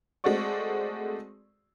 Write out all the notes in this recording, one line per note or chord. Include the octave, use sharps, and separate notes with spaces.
G#3 A3 C4 F#4 D5 C#6